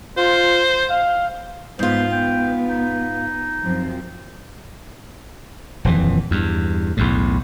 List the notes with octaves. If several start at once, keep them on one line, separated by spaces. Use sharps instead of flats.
F4 C5
F5
G#2 B3 F4 C5
B3 G5
D#4
F#2 F3 C4
D#1 F2 E3
E2 G2
B1 E2 A2